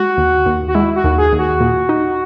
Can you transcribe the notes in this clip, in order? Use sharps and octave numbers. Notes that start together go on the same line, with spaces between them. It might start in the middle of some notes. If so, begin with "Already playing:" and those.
Already playing: G#3 F#4
D#2
D#2
F#4
G#3 E4
F#4
D#2
G#4
D#2
F#4
A#2
D#4